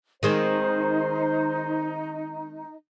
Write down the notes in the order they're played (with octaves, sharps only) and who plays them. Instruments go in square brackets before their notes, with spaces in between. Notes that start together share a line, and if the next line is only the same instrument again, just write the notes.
[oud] D#3 G#3 C4 [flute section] D#4 [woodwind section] C5